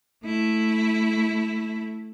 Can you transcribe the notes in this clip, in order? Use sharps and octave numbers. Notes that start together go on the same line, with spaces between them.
A3 E4